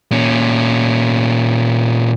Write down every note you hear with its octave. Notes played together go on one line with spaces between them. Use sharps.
A#2 C#4